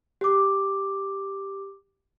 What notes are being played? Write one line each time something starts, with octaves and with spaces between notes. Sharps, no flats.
G4 D6